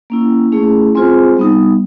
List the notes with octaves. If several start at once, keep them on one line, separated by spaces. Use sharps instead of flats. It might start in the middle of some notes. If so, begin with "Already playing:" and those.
A#3 C#4 E4
A3 C#4 E4 G#4
G#3 C4 F4 G#4 C5
G3 B3 D#4